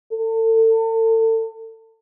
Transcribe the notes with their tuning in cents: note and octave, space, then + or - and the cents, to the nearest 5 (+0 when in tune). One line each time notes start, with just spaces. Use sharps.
A4 +35